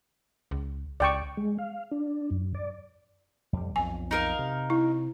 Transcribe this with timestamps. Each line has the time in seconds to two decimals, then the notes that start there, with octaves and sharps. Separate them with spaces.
0.51 C#2
1.00 C#2 D5 G5 C#6
1.37 G#3
1.58 F5
1.91 D4
2.31 F#2
2.55 D5
3.53 F2 G3
3.76 B1 F2 G#5
4.11 D#4 A#4 F5
4.39 C3
4.70 E4